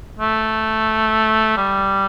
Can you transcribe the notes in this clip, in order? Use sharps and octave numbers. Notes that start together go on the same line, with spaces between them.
A3
G3